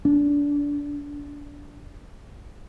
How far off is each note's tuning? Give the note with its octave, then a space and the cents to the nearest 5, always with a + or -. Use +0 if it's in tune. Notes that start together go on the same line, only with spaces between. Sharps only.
D4 -25